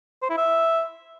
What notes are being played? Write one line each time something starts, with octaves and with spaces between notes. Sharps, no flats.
C5
E4
E5